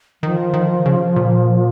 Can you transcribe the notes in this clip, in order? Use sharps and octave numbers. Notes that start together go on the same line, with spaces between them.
D#3 F3
D#3
C#3
A#2